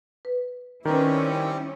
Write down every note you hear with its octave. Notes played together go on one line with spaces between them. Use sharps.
B4
D#3 G3 C4 C#4 E4 G4 B4 A#5